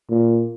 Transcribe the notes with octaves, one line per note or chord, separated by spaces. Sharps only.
A#2